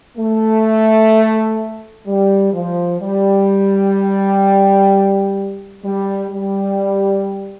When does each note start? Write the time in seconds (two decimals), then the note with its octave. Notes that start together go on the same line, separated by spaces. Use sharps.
0.17 A3
2.06 G3
2.53 F3
3.01 G3
5.83 G3
6.30 G3